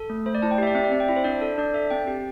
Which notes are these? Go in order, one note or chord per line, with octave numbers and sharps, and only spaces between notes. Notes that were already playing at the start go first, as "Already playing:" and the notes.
Already playing: A4
A3
A3 C5
D5
E4 A5
G5
G4 E5
D5
C4 E5
D5
C4 E5
G5
E4 E5
C5
D4 D5
A4
D4 D5
A4 E5
C4 G5
G4